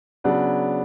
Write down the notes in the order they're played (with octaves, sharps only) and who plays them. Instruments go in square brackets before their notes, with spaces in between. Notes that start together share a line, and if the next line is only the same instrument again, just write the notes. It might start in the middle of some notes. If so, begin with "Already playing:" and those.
[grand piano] C#3 F#3 B3 D4